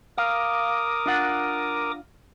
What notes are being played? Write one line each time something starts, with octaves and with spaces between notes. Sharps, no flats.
A#4 F5 D6 D#6
D4 F4 F#5